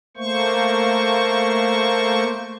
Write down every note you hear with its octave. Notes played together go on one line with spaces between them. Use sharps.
A3 A#3 C5 C#6